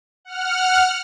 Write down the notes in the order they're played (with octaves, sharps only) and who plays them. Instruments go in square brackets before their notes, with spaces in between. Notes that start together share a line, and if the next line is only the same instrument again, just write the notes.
[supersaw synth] F#5 F6